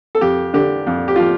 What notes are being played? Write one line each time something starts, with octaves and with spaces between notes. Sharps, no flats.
A4
F2 G4
D3 G4
F2
G4
F4
F3 G4